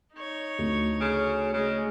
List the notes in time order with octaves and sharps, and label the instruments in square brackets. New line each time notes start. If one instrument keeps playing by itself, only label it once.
[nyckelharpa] D#4 C#5
[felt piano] D2
[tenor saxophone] C#3
[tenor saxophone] C#3 [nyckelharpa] G#3